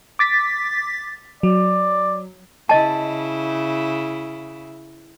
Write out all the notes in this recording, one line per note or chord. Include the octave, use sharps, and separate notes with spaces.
D6 A6 B6
F#3 D5
C#3 E4 D#5 A5